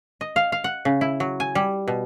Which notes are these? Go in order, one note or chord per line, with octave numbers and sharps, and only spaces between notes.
D#5
F5
F5
F#5
C#3
E4
F#3
G#5
G3
B2